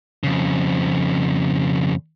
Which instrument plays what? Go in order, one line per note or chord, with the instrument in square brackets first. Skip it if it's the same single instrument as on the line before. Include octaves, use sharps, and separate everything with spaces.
[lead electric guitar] F2 C#3